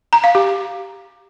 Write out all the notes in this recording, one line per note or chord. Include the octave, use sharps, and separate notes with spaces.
A#5
F5
G4